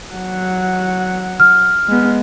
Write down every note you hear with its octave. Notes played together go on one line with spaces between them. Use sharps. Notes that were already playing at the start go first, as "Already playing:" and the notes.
F#3 F#5
F6
G#3 B3